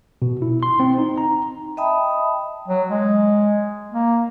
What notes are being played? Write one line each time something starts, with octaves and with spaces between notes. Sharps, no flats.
B2
E4
C6
C4
D#4
A#5
D#5 E5 G5 A5 B5 D#6
F#3
G#3
A#3